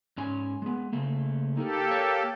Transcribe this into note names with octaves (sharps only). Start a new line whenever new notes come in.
G#2 C#4 G#5
G#3 B3
C#3 A3 A#3
A#3 D#4 G4 A4 A#4
C#5